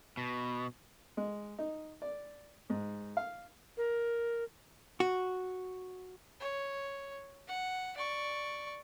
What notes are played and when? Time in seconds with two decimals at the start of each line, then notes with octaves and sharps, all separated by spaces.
0.17 B2
1.17 G#3
1.59 D#4
2.02 D5
2.70 G#2
3.17 F5
3.78 A#4
5.00 F#4
6.40 C#5
7.48 F#5
7.97 D5 C#6